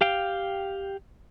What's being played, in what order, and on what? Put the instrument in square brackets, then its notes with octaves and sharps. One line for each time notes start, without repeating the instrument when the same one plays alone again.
[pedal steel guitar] G4 F5 G5